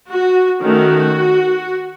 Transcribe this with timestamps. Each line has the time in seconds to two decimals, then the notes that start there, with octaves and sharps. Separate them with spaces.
0.10 F#4
0.63 D#3 A3 C#4 F#4